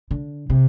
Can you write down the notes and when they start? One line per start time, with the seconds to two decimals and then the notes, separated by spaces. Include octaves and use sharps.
0.11 D3
0.50 C3